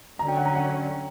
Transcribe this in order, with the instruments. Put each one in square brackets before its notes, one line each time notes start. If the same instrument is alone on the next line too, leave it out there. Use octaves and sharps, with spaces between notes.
[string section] D3 F#3 C#4 [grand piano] A#5
[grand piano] G5
F#5
A#5
F#5